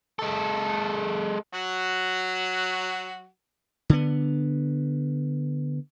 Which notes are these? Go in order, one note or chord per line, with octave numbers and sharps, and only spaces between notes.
G#3 A4
F#3 F#4
D3 B3